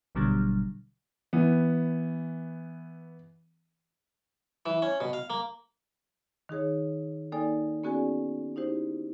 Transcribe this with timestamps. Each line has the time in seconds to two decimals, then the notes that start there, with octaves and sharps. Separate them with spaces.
0.15 G#1 B2 D3 F#3 G3
1.33 E3 B3
4.66 E3
4.82 C#4
5.00 B2
5.13 F5
5.30 A#3
6.49 D#3 D#4 G#4 C#5
7.32 A#3 D#4 A4 D5 G5 G#5
7.84 B3 C#4 F#4 G#4 D5 G#5
8.56 D#4 E4 G4 C5